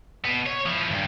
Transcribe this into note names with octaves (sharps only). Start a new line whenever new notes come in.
B2 B3
C#5
F3 E4
G2 D#3